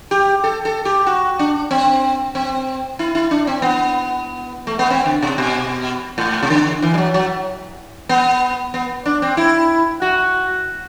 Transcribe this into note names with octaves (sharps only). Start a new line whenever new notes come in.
G4
A4
A4
G4
F#4
D4
C4
C4
E4
E4
D4
C4
B3
A3
B3
C4
D3
C3
B2
A2
C3
D3
E3
G3
F#3
F#3
B3
B3
D4
C4
E4
F#4